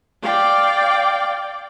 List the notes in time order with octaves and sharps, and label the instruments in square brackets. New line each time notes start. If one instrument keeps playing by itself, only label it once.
[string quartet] D5 F5 G5